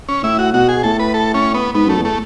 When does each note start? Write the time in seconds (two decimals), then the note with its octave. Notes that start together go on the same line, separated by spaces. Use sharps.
0.09 C#4
0.23 A2 E4
0.39 F#4
0.53 B2 F#4
0.69 G#4
0.83 A2 A4
0.99 B4
1.14 A4
1.34 C#4
1.54 B3
1.74 G#2 B3
1.86 F#2 A3
1.97 E2
2.05 A3